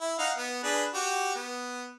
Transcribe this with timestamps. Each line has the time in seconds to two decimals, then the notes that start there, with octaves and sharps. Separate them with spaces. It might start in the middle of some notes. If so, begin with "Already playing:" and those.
0.01 E4
0.19 D#4 F5 F#5
0.38 B3
0.64 D4 G#4 B4
0.94 F#4 G4
1.35 B3